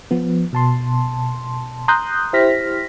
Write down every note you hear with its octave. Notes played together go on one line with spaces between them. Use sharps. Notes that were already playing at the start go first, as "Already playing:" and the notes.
F3 B3
B2 A5 C6
A#5 C6 D#6 F#6 G6
E4 G4 C5 F6 A#6 B6